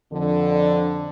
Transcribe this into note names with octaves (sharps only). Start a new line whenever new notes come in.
F2 D3